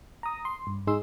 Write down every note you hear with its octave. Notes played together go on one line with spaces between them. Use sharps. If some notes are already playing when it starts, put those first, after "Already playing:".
A#5 D#6
C6
G2
G#2 D#4 G#4 C6 E6